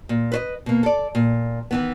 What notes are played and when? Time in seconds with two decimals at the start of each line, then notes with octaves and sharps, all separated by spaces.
0.09 A#2
0.32 B4 C5 D#5
0.66 B2 A#3
0.83 A4 D5
1.15 A#2
1.71 D#3 E3 B3